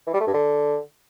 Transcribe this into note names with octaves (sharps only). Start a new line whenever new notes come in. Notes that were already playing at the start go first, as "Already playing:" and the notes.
E3
G3
A3
G2
D3